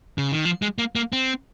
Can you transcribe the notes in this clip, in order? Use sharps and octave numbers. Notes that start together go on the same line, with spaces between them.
C#3
D#3
F3
G#3
A#3
A#3
C4